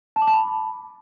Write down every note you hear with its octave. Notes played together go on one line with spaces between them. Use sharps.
A5
D6
A5
B5